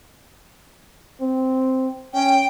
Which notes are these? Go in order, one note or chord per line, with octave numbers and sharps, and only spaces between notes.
C4
C#4 G5